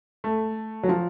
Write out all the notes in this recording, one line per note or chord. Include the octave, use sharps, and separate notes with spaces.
A3
F#3
F3